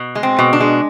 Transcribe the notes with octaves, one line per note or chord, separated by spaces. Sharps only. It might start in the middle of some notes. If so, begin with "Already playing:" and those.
Already playing: B2
G#3
C4
B2
D4
G#3